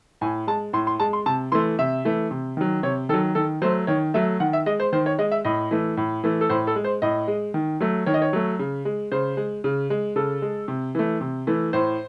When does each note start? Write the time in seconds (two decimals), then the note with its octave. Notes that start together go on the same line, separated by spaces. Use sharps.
0.21 A2 G#5
0.47 G#3 A5
0.73 A2 C6
0.87 C6
1.00 G#3 A5
1.13 C6
1.26 C3 A5
1.52 E3 A3 C6
1.79 C3 E5
2.05 E3 A3
2.31 C3
2.57 D#3 F#3
2.83 C3 C#5
3.09 D#3 A4
3.14 F#3
3.35 D#3 A4
3.62 F#3 A3 C5
3.87 D#3 C#5
4.14 F#3 A3 E5
4.40 D#3 F#5
4.53 E5
4.66 G#3 D#5
4.80 C5
4.93 D#3 C5
5.06 C#5
5.18 G#3 D#5
5.31 E5
5.45 A2 D#5
5.71 E3 A3
5.97 A2
6.24 E3 A3
6.41 A4
6.50 A2 C5
6.67 A4
6.76 G#3
6.84 C5
7.02 A2 D#5
7.28 G#3
7.54 D#3
7.80 F#3 A3
8.06 D#3 C#5
8.14 D#5
8.22 C#5
8.33 F#3 A3
8.59 C#3
8.85 G#3
9.12 C#3 C5
9.37 G#3
9.64 C#3
9.90 G#3
10.16 C#3 A4
10.42 G#3
10.68 C3
10.95 E3 A3
11.21 C3
11.47 E3 A3
11.73 A2 C5